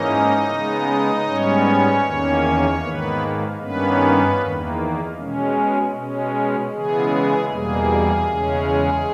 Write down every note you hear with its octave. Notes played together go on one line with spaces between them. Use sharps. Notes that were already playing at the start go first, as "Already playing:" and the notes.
Already playing: G#2 E3 A#3 C#4 D#4 D#5
C#3 G#3 B3
G#2 G3 B3 C#4 C#5
E2 D#3 A#3 C#4
G#2 D#3 A#3 B3 B4
G2 D#3 A#3 B3 C#4 B4
E2 D#3 A#3
B2 G#3 C#4
B2 G#3 C#4
C#3 E3 G#3 B3 G#4
E2 B2 G3 A#3 G#4
E2 C#3 G#3 C#4